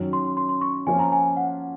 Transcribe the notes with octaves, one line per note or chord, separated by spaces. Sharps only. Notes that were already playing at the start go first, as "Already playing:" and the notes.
Already playing: F#2 D#3 F#3 C#4
C6
C6
C6
C#6
F3 A#3 C#4 F4 G#5
A#5
G#5
F#5